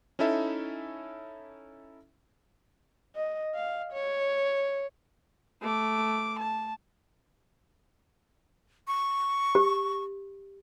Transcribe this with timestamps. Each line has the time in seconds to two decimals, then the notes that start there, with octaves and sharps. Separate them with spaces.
0.19 C#4 D#4 E4 A4 E5
3.15 D#5
3.55 F5
3.92 C#5
5.61 A3 D6
6.38 A5
8.87 C#6
9.55 G4